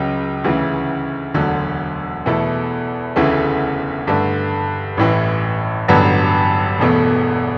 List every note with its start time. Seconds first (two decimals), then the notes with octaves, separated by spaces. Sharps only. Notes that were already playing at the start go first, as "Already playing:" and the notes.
Already playing: C#2 C#3 F#3
0.44 D2 C#3 E3
1.34 E1 D2 D3 F#3
2.26 E2 B2 A3 E4 A4
3.16 E1 D2 C#3 E3 A3
4.07 G2 D3 A3
4.97 A1 A2 E3
5.88 A1 G2 D3 F#3 B3
6.80 E1 E2 B2 A3